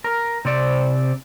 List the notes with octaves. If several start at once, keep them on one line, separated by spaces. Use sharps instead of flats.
A#4
C3 C4 D5